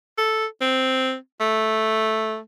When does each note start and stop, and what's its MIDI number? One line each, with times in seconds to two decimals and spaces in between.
0.18 0.46 69
0.61 1.15 60
1.41 2.38 57